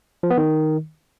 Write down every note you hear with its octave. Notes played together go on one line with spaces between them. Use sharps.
F3
B3
D#3